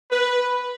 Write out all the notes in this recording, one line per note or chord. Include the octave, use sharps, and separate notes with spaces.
B4